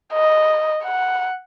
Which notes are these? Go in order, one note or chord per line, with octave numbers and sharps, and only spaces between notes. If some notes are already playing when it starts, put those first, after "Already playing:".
D#5
F#5